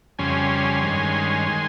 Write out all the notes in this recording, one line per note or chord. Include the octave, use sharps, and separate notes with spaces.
F2 C#3 G3 C#4 G#5 C6
G2 D#3 G#3 C#4
D#3 G#3